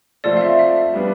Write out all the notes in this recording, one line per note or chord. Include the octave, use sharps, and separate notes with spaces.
F3 A3 C4 F4 A4 D5
F5
E5
E5
G3 B3 D4